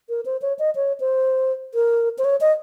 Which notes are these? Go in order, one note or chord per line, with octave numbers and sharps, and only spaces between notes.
A#4
C5
C#5
D#5
C#5
C5
A#4
C5
C#5
D#5